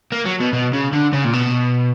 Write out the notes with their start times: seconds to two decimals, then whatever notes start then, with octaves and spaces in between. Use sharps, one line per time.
0.12 A#3
0.25 F#3
0.40 B2
0.53 B2
0.74 C#3
0.93 D3
1.13 C#3
1.25 A#2
1.33 B2